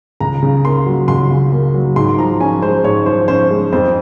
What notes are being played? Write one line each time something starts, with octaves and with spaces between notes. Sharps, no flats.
C#2 A#5
C#3
A#3 C6
F#3
C#2 C6
C#3
A#3
F#3
G#2 C6
F3 A#5
C#4 G#5
G#3 C5
G#2 C#5
F3 C5
C#4 C5
G#3
F2 C5